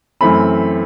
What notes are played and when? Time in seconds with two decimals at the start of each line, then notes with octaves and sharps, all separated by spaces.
0.21 F#2 E3 A3 C4 B5